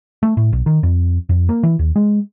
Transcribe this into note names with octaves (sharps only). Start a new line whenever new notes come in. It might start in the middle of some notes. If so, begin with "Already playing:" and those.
A3
A2
B1
D#3
F2
F2
A#3
E3
D#2
G#3